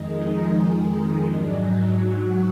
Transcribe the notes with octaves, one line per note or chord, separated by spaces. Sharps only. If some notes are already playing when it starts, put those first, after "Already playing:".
Already playing: F2 D#3 G#3 D#4
D#4
G#2 F#3 D4
D#4
F#4